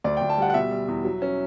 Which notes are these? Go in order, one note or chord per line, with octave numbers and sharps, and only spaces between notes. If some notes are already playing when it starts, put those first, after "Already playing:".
D2 D5
D2 G5
A5
G3 F#5
F#5
B2 E5
G3
E2
F#3
C#4